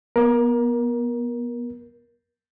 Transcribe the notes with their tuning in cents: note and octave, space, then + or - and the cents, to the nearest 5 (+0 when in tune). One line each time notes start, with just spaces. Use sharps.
B3 -25 A#4 +20